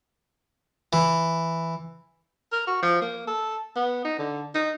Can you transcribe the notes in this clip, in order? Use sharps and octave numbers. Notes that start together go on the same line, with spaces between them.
E3
A#4
F#4
F3
A#3
A4
B3
D#4
D3
D#4